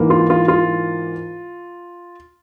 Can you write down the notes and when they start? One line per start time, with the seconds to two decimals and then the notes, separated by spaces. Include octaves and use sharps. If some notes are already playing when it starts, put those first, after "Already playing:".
Already playing: G#2 E3 A#3
0.10 F4
0.30 F4
0.48 F4